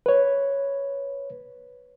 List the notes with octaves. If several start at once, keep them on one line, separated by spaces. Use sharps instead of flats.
B4 C#5